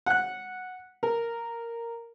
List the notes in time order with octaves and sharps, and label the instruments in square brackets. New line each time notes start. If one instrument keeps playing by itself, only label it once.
[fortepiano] F#5 F#6
A#4